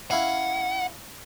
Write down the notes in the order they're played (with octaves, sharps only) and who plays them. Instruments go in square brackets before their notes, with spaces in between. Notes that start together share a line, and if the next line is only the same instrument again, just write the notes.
[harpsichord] C#4 E4 F5 [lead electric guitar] F#5